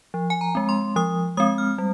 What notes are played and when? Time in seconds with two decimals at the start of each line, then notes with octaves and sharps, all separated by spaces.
0.14 F3
0.30 G#5
0.41 A#5
0.55 G#3 C4
0.69 C6
0.96 F3 D#6
1.37 G#3 C4 D#6
1.58 F6
1.78 G3